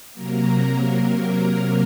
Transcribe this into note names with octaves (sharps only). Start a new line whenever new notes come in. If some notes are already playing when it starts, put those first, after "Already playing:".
C3 F#3 A#3 A#4